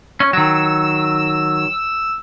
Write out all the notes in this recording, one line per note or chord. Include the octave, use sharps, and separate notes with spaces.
C#4
D#3 F#3 E6